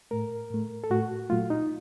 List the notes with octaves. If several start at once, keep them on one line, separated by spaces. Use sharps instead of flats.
A2 A3 A#4
A2 A3
A4
A2 A3 F#4
A#2 F#3 A3 F4
D#4